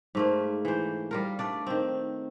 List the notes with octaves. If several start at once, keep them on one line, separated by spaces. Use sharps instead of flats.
G#2 A3 A#3
E3 C5
G3 F4 A#4
A3 D4 D5
D#3 C4